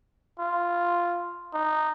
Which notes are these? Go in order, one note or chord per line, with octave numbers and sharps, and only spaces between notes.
F4
D#4